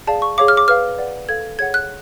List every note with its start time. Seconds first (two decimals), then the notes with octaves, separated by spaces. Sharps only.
0.07 G#4 D5 F5 A5
0.22 C#6
0.38 G#4 C#5 F5 D6
0.48 F6
0.57 D6
0.68 B4 F5 F6
0.98 B4 D5 F#5
1.29 A4 F5 G#6
1.59 G#4 C#5 F#5 G#6
1.74 F#6